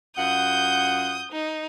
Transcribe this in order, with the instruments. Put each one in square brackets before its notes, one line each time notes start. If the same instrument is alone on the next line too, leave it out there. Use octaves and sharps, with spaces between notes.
[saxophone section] F#2 F4 F#5 [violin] D#6 G6
[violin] D#4